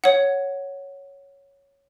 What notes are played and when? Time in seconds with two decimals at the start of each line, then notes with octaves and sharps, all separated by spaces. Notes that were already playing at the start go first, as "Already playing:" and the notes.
0.04 C#5 F#5